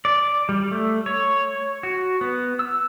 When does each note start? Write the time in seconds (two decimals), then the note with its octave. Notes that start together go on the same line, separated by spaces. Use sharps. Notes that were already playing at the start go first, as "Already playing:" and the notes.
0.05 D5
0.49 G3
0.71 A3
1.06 C#5
1.83 F#4
2.21 B3
2.59 E6